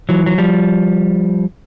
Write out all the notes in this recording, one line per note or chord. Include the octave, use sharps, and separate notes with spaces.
E3 F#3
F#3
F3 G3